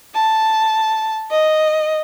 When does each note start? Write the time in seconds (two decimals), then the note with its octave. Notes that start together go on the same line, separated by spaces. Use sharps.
0.14 A5
1.31 D#5